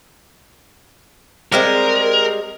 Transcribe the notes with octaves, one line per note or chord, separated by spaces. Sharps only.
G3 G#3 C4 A#4